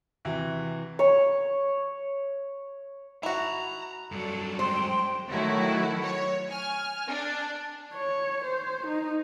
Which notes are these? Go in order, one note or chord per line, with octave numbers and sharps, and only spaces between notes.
C3 E3 F#4
C#5 C#6
E4 F#4 A5 A#5
G2 F#3 D4 A4
G#3 C5 G5
D#3 F#3 A3 E4 F#4
C#5
G#5 F6
D4
C#5
C5
D#4